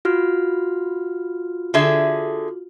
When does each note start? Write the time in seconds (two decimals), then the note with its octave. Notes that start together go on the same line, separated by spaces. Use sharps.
0.05 F4 F#4 F6
1.74 D3 G#4 E5